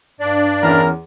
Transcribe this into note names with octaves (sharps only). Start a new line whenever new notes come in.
G2 D4 D5
E2 C#4 E4 A#4